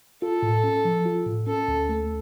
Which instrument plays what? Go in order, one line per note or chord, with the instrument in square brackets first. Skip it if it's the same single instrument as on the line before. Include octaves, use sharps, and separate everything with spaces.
[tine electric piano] F4 [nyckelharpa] A4
[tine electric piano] A2
C#4
F3
F4
A2
[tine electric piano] C#4 [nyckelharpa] A4
[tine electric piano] D2
A3